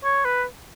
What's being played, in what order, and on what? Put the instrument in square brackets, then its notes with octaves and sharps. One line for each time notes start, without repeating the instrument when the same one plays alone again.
[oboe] C#5
B4